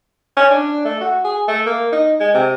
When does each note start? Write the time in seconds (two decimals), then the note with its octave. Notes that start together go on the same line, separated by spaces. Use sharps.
0.37 C#4
0.51 D4
0.85 A3
1.01 F#4
1.24 G#4
1.48 A3
1.66 A#3
1.92 D#4
2.20 G#3
2.35 C3